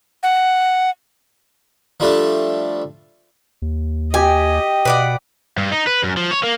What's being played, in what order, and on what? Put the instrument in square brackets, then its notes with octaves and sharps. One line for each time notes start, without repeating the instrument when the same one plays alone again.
[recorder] F#5
[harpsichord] F3 G3 A3 D4
[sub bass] D#2
[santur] G4 G5 [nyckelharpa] D#5 [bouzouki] G#5
[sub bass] B2 [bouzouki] B4 D5 F#5
[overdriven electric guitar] G2
D#4
B4
F#2
F3
C#5
A#3